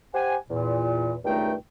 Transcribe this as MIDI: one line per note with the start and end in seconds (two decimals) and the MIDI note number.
0.14 0.36 67
0.14 0.36 72
0.14 0.36 78
0.14 0.36 80
0.50 1.16 40
0.50 1.16 46
1.24 1.54 37
1.24 1.54 43
1.24 1.54 51
1.24 1.54 57
1.24 1.54 63
1.24 1.54 79